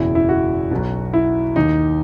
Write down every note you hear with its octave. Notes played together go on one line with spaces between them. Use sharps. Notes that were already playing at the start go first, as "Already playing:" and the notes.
Already playing: F#1 E2 B2 E4
E4
F#4
B1 B2
E4
D#2 D#3 D#4